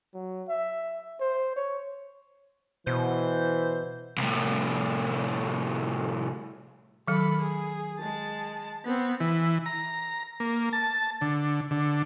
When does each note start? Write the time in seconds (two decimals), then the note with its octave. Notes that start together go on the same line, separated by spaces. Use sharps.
0.14 F#3
0.49 E5
1.20 C5
1.56 C#5
2.87 B2 E3 C5
4.18 C2 A2
7.08 D#3 F#3 A4 B5
7.39 G#4
7.99 G#3 A5
8.85 B3 C4
9.21 E3
9.66 A#5
10.40 A#3
10.73 A5
11.21 D3
11.71 D3